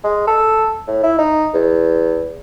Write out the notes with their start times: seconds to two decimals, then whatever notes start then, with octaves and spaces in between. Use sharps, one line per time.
0.04 G#3
0.27 A4
0.88 A2
1.03 E4
1.18 D#4
1.54 E2